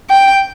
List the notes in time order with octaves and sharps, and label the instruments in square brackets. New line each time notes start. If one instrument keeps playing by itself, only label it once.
[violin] G5